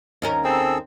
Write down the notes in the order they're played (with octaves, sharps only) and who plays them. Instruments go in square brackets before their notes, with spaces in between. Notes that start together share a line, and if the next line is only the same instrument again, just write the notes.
[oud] D#2 C#4 A#4
[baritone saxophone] C4 [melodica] G#4 A4 E6